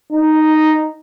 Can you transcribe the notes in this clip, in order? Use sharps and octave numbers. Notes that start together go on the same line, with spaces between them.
D#4